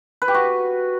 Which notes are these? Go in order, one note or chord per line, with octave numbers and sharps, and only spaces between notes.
B4
G4
F#4